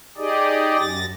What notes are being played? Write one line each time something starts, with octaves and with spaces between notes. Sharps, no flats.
D#4 G4 G#4 D5 D#5
F#2 A6 A#6